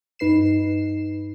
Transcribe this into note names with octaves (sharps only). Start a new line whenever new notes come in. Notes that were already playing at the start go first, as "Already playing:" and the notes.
G2 D#4 B4 C7 E7